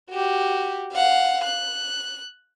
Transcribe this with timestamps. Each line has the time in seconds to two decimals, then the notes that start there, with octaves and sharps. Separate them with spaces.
0.10 F#4 G4
0.93 F5 F#5
1.44 F#6